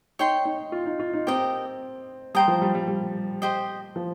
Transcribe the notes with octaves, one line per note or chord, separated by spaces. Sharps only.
D#4 C#5 G5 C6
D#4
F4
D#4
F4
D#4
C4 G4 A#4 D#5
G3 C5 G5 A#5 D#6
F3
G3
G3
G3
G4 C5 D#5
F3